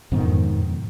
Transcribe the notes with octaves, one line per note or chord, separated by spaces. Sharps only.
F2 G#2 B2 D#3